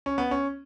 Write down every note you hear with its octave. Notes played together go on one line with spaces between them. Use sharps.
C#4
B3
C#4